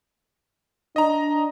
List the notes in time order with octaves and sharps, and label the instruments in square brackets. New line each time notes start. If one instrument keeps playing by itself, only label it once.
[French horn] D4 [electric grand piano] D#5 A#5